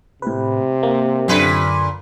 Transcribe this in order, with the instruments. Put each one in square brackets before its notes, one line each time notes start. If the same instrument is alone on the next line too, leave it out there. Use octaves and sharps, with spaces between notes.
[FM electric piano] A2 B4 [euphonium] C3
[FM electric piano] A#3
[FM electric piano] F#2 D3 [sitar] A#2 B4